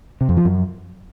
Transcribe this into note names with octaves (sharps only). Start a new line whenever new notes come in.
C3
F2
F3
F#2